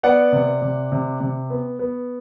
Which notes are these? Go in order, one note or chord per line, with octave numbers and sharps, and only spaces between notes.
B3 D5 F#5
C3
C3
C3
C3
B3
B3